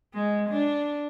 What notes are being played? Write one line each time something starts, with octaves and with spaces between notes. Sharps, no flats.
G#3
D4